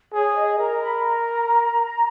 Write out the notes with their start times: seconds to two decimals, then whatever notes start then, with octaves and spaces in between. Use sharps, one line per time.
0.13 G#4 C#5
0.36 D#5
0.58 A#4 A#5
0.81 B5
1.03 A#5